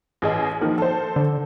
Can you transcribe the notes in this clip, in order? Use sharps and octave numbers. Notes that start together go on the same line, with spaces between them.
A1 G#4 D#5
D#3 F3 A#3
A4 C5
D3